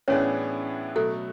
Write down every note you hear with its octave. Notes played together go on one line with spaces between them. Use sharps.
A2 E3 B3 C#4 D4 G#4 C#5
B2 F#3 A3 A4